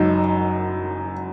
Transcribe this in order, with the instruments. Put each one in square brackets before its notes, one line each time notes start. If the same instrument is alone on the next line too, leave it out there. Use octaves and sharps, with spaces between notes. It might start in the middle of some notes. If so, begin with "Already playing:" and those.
Already playing: [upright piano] F#1 F#2 F#3 D#4